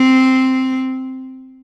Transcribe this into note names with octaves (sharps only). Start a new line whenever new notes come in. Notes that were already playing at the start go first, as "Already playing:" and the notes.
Already playing: C4